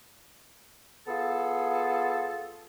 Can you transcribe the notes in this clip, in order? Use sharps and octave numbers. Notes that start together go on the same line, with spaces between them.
B3 F4 G#4 A4